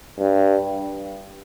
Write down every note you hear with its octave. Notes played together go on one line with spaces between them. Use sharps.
G2